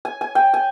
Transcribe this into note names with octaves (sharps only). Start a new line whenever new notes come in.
G#5
G#5
G5
G#5